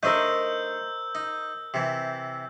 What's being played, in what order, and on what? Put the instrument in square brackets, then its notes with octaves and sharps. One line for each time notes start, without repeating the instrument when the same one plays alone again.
[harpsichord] A3 D4 D#4 [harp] A#4 C5 D#5 [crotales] E6 G6
[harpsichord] D#4
C3 E3